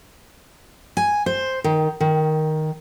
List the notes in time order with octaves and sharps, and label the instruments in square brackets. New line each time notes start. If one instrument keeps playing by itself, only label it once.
[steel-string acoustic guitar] G#5
C5
D#3
D#3